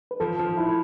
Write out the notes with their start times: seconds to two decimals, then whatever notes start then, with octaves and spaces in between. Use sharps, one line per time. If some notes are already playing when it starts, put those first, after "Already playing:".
0.11 B4
0.20 F3 A4
0.39 F3
0.58 E4